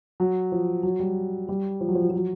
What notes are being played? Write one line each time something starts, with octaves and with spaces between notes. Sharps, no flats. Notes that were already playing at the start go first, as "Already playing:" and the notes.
F#3
F3
F#3
G3
G3
F3
F#3
F3
F#3
F3
F#3